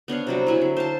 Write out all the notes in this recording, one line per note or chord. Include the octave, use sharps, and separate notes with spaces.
B3 D4 C#5 F5
C3 F#3 G3
F#3 E4 G#5
D3
C5 F5 A5